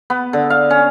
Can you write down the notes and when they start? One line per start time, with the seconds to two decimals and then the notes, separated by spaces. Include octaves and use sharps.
0.10 B3
0.33 D3
0.50 F5
0.70 C#4